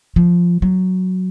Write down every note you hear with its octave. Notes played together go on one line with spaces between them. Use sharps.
F3
F#3